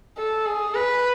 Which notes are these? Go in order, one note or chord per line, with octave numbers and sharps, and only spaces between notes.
A4
G#4
B4